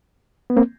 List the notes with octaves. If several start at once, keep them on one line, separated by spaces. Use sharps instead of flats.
B3
A#3 C4